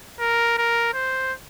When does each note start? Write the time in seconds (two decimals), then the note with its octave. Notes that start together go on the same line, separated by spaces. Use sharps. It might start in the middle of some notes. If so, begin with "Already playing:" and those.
0.19 A#4
0.58 A#4
0.94 C5